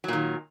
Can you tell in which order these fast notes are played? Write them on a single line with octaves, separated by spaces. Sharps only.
F#3 A#2 D#3